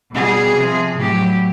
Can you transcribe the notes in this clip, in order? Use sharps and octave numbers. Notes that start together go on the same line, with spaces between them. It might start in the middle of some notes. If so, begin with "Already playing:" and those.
B2 G3 G#4
C3 F3
A2 F#3 G4